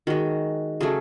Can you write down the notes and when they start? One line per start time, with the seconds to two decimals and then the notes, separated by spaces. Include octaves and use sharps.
0.07 D#3 G#3 F#4
0.81 C#3 F#3 A3 G#4